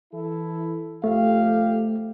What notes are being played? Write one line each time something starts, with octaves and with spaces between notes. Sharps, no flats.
E3 E4 A4
F2 A3 G4 F5